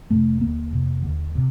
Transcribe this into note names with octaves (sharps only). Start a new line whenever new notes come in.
F2 C3 A3
D#2 D3 A#3
F2 C3
D#2 D3
C3